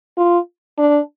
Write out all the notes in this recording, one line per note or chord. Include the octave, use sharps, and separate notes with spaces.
F4
D4